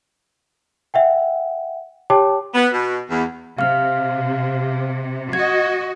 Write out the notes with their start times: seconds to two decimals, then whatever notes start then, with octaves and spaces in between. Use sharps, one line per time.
0.94 E5 F#5 G5
2.10 G4 C#5 G5 A5 D6
2.54 B3
2.73 B2
3.10 E2
3.58 C3 F5 F6
5.33 F#4 D#5 G#6